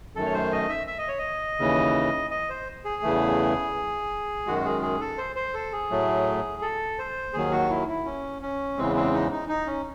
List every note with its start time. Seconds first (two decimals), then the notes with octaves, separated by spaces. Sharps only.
0.15 F#2 D#3 A3 A4
0.26 C#5
0.34 C5
0.52 D#5
0.69 E5
0.87 E5
0.98 D#5
1.08 C#5
1.19 D#5
1.59 D#2 C#3 E3
2.31 D#5
2.49 C5
2.85 G#4
3.03 E2 C#3 E3 A3
4.46 F#2 D#3 G#3 F#4
4.65 G#4
4.82 G#4
5.01 A4
5.18 C5
5.36 C5
5.54 A4
5.73 G#4
5.90 A2 F#3 A3
6.62 A4
6.99 C5
7.33 D#2 D#3 F#3 G#4
7.52 F#4
7.70 E4
7.88 E4
8.06 C#4
8.42 C#4
8.77 E2 C#3 E3 G#3 C4
8.96 C4
9.14 D#4
9.32 D#4
9.49 D#4
9.67 C#4